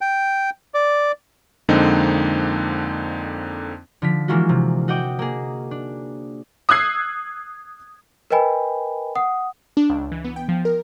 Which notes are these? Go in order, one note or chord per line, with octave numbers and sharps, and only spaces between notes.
G5
D5
F2 D3 G#3 A#3 C4 D#4
D3 F3 B6
E3 G#3 A#3 C#4 F4 F#4
C3
F#4 D#5 F#5 G5 D6
A#3 G#4
D4
D#6 E6 F#6 G#6 C7
A#4 B4 D#5 G5 G#5 B5
F#5 D#6
D4
C#2
E3
B3
G5
F3
A#4